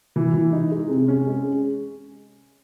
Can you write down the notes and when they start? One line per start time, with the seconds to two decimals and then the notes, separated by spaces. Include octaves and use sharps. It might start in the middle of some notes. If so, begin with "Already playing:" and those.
0.16 E3
0.34 E3
0.52 D#4
0.71 G#3
0.90 C3
1.08 C#4
1.27 G#3